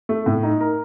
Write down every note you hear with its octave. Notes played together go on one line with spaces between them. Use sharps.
A3
A2
D#4
A#4